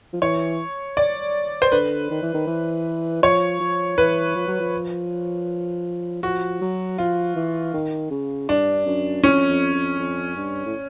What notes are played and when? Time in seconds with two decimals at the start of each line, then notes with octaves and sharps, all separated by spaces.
0.13 F3
0.21 E3 C#5
0.97 D5
1.62 C5
1.72 D3 B4
2.10 D#3
2.23 E3
2.34 D#3
2.47 E3
3.23 F3 C#5
3.60 F3
3.98 E3 B4
4.35 F3
4.48 F#3
4.60 F3
6.23 F3 F#4
6.61 F#3
6.98 F3 F4
7.36 E3
7.74 D#3
8.11 C#3
8.49 G2 D4
8.87 F#2
9.23 F2 C#4
9.50 F2
9.74 F2
9.99 F2
10.37 G2
10.66 A2